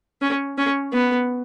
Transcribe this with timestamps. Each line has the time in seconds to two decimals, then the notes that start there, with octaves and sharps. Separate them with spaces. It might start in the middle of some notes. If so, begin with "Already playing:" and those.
0.21 C#4
0.58 C#4
0.93 B3